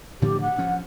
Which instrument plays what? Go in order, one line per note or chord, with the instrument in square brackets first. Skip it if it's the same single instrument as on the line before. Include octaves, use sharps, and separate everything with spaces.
[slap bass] A2 D3 F3 [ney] G4
[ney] F#5
[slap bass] F3 C#4